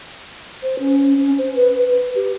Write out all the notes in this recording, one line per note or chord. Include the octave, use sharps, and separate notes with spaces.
C5
C#4
C#4
C5
B4
B4
G4